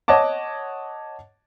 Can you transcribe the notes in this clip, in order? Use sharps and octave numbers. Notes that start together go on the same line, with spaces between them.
C#5 D#5 F#5 A5 D6